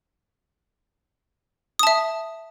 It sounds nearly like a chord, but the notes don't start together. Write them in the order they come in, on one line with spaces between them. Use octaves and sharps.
D#6 A5 E5